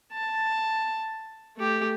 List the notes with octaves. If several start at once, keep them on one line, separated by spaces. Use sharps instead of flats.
A5
A3 G4